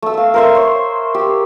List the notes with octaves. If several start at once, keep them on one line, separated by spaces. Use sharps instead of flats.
A3 E6
F5 E6
A#4 C5 E5
C5 C#5
G4